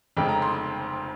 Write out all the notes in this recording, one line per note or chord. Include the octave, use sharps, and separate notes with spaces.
F1 F2 C#3 G#3 G5
A#5
C6